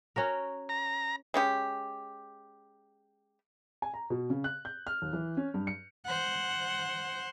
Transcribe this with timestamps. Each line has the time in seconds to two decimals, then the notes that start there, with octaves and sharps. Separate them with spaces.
0.16 C#4 F#4 A#4
0.69 A#5
1.34 G#3 C#4 G4
3.82 G#5
3.94 A#5
4.10 B2
4.30 C#3
4.44 F#6
4.65 G6
4.87 F6
5.02 D#2
5.13 E3
5.37 C#4
5.54 G2
5.67 C#7
6.06 C5 F#5